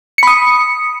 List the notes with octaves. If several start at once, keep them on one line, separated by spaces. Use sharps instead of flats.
B5 D#6 C#7